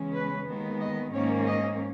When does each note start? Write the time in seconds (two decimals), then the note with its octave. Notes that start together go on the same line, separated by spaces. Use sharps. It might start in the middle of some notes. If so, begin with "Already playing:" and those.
Already playing: E2 C#3 G#3 C#4
0.14 B4
0.47 D#2 D#3 G#3 B3
0.80 D#5
1.13 G#2 D#3 A#3 C#4 C#5
1.47 D#5